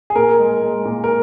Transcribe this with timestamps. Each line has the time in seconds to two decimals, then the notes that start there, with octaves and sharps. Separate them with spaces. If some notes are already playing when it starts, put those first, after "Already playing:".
0.10 G#4
0.16 A#2 A#4
0.39 G#3
0.63 G#3
0.85 A#2
1.04 A#4